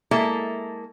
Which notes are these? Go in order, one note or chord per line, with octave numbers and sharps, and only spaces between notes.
G#3 A#3 E4 A4 E5